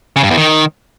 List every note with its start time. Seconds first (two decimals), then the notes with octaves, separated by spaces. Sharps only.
0.16 C#3
0.23 G2
0.30 E2
0.37 D#3